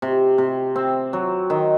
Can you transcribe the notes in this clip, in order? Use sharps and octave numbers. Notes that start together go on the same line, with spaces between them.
C3
C3
C4
F#3
D#3